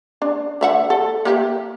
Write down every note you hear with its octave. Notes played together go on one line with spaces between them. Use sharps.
D4
D3 E5 F#5
A4
A#3 G4 E5